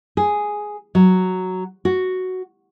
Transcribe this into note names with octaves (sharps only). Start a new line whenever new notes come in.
G#4
F#3
F#4